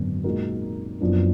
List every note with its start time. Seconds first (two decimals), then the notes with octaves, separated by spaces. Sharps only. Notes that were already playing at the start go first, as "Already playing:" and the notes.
Already playing: G#1 F#2 D3 F#3 B3
0.24 A#2 G#3 D#4 F#4 A#4
1.00 F#1 F#2 F3 B3 D4